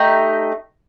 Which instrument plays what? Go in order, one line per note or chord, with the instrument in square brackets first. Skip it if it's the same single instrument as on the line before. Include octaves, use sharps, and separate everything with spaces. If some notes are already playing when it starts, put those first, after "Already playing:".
Already playing: [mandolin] A3 D#4 G4